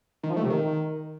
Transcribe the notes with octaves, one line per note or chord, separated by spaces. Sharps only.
D#3
F3
A3
C3
D#3